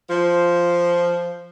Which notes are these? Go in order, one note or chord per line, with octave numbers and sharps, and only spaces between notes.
F3